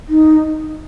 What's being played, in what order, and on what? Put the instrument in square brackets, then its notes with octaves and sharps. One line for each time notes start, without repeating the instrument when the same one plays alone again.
[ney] D#4